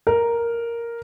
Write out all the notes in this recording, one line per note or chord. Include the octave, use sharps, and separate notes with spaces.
A#4